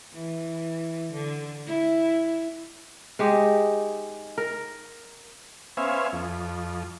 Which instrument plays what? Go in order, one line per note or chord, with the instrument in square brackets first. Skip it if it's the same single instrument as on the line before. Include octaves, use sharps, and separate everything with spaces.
[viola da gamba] E3
D3
E4
[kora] G#3 D#4 G4
A#4
[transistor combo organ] B3 C#4 C5 E5 F5 G#5
F2